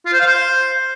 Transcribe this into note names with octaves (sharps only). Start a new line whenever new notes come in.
F4
C5
F5
C5